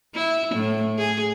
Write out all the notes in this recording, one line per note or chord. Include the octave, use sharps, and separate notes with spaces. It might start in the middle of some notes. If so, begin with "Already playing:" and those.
E4
A2
G#4